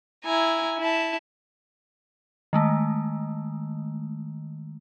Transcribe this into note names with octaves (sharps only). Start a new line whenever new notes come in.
E4 G#5 A#5
E4 A5
D#3 G#3 A3